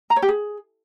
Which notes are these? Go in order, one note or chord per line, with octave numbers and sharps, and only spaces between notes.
A#5
C#5
G4
G#4